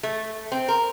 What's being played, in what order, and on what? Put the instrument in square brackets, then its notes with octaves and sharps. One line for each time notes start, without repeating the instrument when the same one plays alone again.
[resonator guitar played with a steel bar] A3
C4
A#4